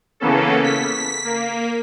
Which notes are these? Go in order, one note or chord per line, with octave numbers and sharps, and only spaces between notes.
C#3 E3 A#3 B3 C#4 A4
B6
A#3